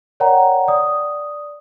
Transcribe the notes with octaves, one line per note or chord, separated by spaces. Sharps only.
A#4 C#5 D5 F#5 G5 A#5
D5 D#6